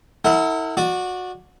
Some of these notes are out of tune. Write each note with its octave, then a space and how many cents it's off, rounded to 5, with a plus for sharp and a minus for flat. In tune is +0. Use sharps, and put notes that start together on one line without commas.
E4 -30 A4 +45 F#5 +0
F#4 -20 D5 +0